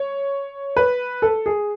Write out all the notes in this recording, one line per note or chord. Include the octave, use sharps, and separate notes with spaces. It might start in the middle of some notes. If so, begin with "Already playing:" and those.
Already playing: C#5
B4
A4
G#4